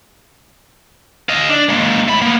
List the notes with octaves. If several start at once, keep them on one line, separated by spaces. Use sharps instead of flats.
D#5 F5
D4
G#3 A#3
A3 B5
A#3 B3